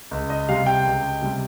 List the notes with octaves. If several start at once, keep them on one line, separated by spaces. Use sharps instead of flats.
C#2
D#5
C3 G3 F5
G5
C#2
C3 G3